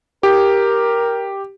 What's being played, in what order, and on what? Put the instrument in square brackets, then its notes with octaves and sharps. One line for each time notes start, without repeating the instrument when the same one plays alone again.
[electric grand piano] G4 [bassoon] A#4